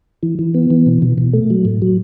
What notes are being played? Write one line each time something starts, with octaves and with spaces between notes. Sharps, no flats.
E3
E3
B3
E3
B2
B2
B2
A3
F#3
A2
F#3